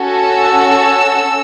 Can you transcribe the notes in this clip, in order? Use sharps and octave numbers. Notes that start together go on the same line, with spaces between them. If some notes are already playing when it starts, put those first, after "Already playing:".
Already playing: C#4 F#4 A4
E6